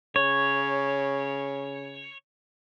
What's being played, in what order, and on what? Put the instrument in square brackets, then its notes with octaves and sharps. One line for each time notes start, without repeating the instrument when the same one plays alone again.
[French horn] C#3 [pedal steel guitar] C#5